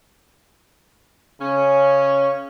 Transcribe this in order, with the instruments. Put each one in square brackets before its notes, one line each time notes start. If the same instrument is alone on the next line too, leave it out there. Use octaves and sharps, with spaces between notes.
[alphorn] C#3 [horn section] C#4